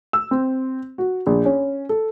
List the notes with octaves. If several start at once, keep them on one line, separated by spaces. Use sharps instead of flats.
E6
C4
F#4
A#1
C#4
A4